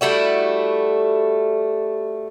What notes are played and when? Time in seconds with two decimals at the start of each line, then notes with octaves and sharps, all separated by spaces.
0.01 G3 A3 E4 F#4